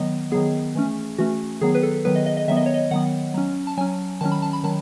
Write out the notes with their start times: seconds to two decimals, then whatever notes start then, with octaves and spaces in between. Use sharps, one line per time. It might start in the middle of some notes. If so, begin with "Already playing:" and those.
Already playing: D#3 F#3 B3 D#5
0.32 D#3 F#3 B3 G#4
0.75 E3 A3 C#4
1.18 E3 A3 C#4 F#4
1.61 D#3 F#3 B3 G#4
1.75 B4
1.83 A4
2.05 D#3 F#3 B3 B4
2.16 D#5
2.26 D#5
2.37 D#5
2.48 D#3 F#3 B3 E5
2.57 D#5
2.66 C#5
2.74 D#5
2.91 D#3 F#3 B3 F#5
3.34 F#3 C#4
3.67 A5
3.77 F#3 C#4 G#5
4.21 D#3 F#3 C#4 A5
4.32 B5
4.42 A5
4.53 B5
4.63 D#3 F#3 A5